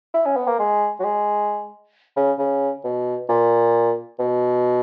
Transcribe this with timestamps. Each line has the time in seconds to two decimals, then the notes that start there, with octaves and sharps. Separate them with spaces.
0.14 E4
0.25 C#4
0.36 B3
0.47 A#3
0.59 G#3
1.00 F#3
1.04 G#3
2.16 C#3
2.39 C#3
2.84 B2
3.29 A#2
4.19 B2